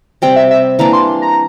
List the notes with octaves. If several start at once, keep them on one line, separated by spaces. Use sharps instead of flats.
C3 G3 C4 G5
E5
E5
E3 A#3 D4 A#5
C6
A#5